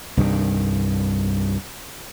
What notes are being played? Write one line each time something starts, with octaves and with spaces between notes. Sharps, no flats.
C2 G2 D#3